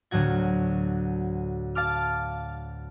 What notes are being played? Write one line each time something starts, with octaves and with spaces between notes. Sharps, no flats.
D2 A2 F#3 F#4 G#6
F5 A5 D6 F6